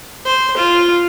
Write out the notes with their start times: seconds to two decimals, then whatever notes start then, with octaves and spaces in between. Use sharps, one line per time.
0.25 C5
0.57 F4